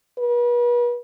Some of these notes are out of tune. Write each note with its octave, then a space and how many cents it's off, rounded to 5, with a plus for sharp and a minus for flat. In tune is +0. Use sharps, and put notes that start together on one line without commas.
B4 -40